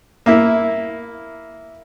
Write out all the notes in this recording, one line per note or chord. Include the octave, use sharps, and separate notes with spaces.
A#3 E4 E5